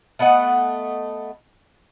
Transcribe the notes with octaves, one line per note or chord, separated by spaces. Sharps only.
A3 B3 D#5 F#5